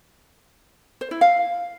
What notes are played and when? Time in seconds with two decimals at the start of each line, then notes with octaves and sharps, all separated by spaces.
1.01 C5
1.11 E4
1.21 F5